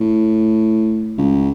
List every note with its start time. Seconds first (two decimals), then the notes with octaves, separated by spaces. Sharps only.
0.01 A2
1.18 C#2